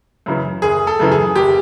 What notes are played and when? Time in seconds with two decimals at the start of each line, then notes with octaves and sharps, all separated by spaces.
0.26 F#2 C#3 E3
0.62 F#1 G#4
0.87 A4
1.00 F#2 C#3 E3
1.12 G#4
1.35 F#1 G4